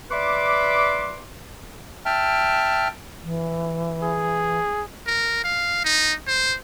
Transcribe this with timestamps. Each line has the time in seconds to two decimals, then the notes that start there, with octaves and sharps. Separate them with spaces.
0.11 B4 D5 E5 B5 C6 D6
2.05 E5 G5 A5 F6
3.23 E3
4.03 G#4
5.07 A#4
5.44 F5
5.84 D#4
6.27 C5